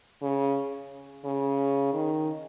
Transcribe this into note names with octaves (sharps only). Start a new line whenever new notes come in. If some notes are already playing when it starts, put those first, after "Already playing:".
C#3
C#3
D#3